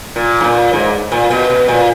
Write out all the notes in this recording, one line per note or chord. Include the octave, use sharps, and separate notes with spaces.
A#2
G#2
A#2
G#2
A#2
B2
B2
A#2